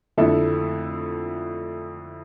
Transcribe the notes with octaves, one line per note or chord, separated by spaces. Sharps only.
F2 D3 A3 E4 A4